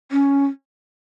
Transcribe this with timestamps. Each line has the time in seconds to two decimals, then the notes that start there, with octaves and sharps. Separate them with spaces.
0.12 C#4